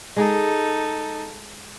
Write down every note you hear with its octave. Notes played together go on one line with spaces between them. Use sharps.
G#3 D#4 G#4 A4